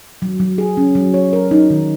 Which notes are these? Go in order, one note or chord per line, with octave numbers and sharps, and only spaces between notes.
F#3
F#3
G#4
C#4
F#3
C#5
A#4
D#4
D#3